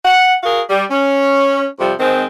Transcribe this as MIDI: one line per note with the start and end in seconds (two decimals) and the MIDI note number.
0.05 0.34 78
0.43 0.61 66
0.43 0.61 68
0.43 0.61 70
0.43 0.61 77
0.70 0.84 55
0.91 1.66 61
1.79 1.93 41
1.79 1.93 48
1.79 1.93 53
1.79 1.93 55
2.00 2.25 51
2.00 2.25 56
2.00 2.25 60